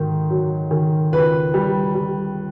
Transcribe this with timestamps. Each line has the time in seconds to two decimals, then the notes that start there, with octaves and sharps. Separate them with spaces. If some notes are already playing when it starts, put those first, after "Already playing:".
Already playing: G#2 D#3
0.30 F#3
0.71 D#3
1.12 C#2 B4
1.54 G3
1.94 G3